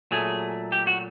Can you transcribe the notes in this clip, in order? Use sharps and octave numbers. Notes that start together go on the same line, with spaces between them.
A#2 F#3 A3 G#4
G4
F#4